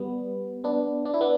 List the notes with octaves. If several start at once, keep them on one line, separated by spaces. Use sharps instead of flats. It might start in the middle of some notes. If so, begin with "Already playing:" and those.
Already playing: G3 B3
B3 D4
D4
E4
B3 D4